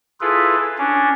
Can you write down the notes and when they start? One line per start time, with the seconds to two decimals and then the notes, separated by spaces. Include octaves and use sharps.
0.21 E4 F4 G#4 A4 B4
0.78 C#4 D4